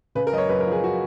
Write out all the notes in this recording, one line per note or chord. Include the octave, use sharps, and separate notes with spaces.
C#3 B4
A#4
F#2 D#5
C#5
F#2 B4
A#4
F3
G#4
F#4